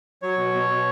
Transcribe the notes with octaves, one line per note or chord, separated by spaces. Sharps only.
F#3 C#5
B2
B2
B2